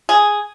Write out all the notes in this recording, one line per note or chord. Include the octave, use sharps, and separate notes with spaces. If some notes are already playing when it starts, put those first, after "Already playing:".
G#4